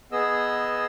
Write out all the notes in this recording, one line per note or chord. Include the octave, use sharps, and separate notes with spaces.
B3 G#4 D#5 E6